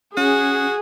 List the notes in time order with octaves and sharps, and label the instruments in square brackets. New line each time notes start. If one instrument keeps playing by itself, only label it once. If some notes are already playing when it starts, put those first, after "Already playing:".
[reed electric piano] C#4 [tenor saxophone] F#4 [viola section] G#4